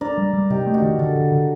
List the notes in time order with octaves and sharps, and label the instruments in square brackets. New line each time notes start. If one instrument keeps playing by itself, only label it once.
[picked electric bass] D4 [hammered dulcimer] A#4 D5
[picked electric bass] G3
G3
[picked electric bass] C3 [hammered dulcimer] D#4 G4
[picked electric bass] A3
[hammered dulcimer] D4 F#4
[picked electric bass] D#3
[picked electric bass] D3 [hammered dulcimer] F#4 A4
[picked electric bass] D3
D3